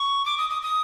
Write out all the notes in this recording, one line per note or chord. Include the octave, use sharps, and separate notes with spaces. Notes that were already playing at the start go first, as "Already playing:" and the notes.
Already playing: C#6
D6
D#6
D#6
D#6